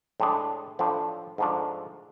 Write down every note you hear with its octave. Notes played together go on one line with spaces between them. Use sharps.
A2 G#3 D4
A2 F3 A3 D4
G#2 F3 A3 D4